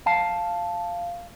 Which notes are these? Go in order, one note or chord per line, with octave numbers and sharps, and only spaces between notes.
F5 A5